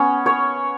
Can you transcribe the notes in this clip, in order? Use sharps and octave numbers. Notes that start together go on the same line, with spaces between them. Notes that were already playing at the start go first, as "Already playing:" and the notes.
Already playing: B3 C#4 C#5
C#5